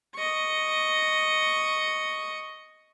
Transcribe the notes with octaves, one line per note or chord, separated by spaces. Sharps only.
D#5 C#6